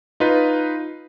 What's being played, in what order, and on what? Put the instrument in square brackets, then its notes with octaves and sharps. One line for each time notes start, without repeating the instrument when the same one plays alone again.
[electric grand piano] D#4 F4 B4